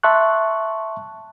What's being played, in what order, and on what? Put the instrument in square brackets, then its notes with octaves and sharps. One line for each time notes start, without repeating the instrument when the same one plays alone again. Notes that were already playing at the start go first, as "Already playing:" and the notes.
[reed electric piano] E5 A5 C6 C#6 F#6